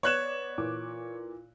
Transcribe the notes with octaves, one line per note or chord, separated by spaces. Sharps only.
B3 C#5 D5 F#6 E7
A#2 E3 D6